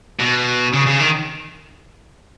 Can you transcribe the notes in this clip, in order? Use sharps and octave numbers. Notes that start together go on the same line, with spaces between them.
B2
C#3
C#3
D#3